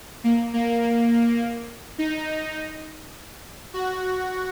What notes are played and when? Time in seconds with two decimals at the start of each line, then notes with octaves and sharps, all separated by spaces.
0.24 A#3
0.53 A#3
1.98 D#4
3.74 F#4